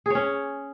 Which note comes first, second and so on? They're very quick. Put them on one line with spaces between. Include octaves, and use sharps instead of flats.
G#4 C#5 C#4